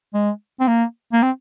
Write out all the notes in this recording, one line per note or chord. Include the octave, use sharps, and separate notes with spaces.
G#3
C4
A#3
A#3
C4